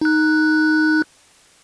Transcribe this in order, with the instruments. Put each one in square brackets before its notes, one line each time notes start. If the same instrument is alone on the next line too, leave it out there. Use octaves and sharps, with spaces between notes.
[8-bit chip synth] D#4 F#6